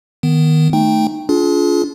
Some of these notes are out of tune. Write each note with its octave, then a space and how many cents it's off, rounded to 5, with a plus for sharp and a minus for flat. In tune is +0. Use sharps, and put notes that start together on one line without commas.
D#3 +0 B3 +0
A3 +0 D#4 -10 G5 +10
D4 -35 F4 +0 G#4 +35